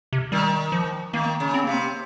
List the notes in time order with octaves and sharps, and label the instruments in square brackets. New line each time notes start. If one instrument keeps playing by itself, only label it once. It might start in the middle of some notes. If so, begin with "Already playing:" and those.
[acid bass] C3
[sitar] D#3 [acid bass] G3
[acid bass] F3
[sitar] D#3 [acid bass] A#3
[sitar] C#3
[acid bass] C4
[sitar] C3 [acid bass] A#3
[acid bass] C4